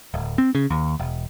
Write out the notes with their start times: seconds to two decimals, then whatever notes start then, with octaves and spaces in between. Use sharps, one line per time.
0.14 D1
0.38 C4
0.55 C#3
0.70 D#2
0.99 E1